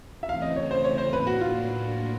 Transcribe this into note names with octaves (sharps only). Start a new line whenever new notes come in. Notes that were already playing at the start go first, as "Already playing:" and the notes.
E5
C#3 E3 A3 C4 F5
D#5
C#5
C5
C#5
C5
A2 F#3 A#3 D4 B4
F#4
F4